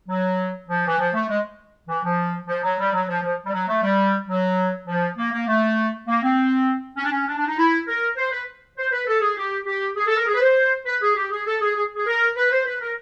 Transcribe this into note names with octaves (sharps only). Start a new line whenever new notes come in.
F#3
F3
E3
F3
A3
G#3
E3
F3
F3
F#3
G3
F#3
F3
F3
G3
F#3
A3
G3
F#3
F3
A#3
A#3
A3
A#3
C4
C#4
D4
C#4
D4
D4
D#4
E4
A#4
C5
B4
C5
B4
A4
G#4
G4
G4
G#4
A4
A#4
G#4
B4
C5
B4
G#4
G4
G#4
A4
G#4
G#4
G#4
A#4
B4
C5
B4
A#4